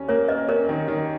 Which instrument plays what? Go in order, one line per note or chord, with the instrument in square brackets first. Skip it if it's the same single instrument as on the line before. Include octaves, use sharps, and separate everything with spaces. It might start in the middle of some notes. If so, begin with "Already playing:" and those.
Already playing: [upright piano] D#2 C#4
[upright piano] A#3 [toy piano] A#4 C#5
[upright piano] C#4 [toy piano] B4 D#5
[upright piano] C#4 [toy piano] A#4 C#5
[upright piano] D#3
D#3